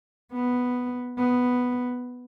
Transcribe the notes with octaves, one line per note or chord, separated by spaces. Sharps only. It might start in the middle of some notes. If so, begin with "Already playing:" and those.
B3
B3